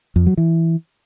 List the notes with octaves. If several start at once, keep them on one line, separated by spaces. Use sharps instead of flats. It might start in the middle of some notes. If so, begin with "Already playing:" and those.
F2
F#3
E3